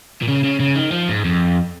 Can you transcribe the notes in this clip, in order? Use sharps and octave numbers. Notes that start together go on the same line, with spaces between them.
A#2
C#3
C#3
C#3
D#3
F3
G#2
F2